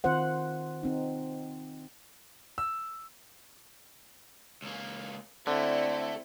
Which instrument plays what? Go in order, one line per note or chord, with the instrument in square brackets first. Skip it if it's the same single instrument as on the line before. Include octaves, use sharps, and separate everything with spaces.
[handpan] D#3 C4 F4 C5 F#5
C4 D#4
[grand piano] E6
[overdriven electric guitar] C#2 A#3
[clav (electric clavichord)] D3 [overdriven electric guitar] A3 [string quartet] C4 E4 [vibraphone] D5